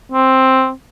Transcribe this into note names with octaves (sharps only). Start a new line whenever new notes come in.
C4